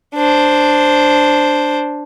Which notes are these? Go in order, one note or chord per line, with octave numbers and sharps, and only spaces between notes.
D4 C5